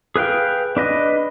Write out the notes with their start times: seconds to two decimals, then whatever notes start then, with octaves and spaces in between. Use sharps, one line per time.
0.16 G#4 B4 F5 G5
0.77 D4 B4 D#5